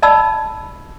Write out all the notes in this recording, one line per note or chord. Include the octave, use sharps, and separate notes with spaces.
D5 D#5 A5 B5 E6